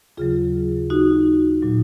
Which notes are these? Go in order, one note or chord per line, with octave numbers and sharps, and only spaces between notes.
D#2 C#3 F#3 F4 G#4
D#4 F#4
A#2 F#3